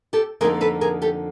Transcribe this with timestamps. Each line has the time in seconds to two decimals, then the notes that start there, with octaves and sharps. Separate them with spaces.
0.13 G4 A4
0.41 F2 D3 F3 A#3 D#4 G#4 A#4
0.61 A4 B4
0.81 G#4 A#4
1.02 G4 A4